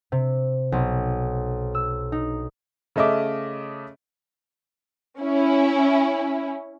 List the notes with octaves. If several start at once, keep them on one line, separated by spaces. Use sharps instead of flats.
C3
B1
E6
D#4
C#3 A3 D#5 E5 D6
C#4 E4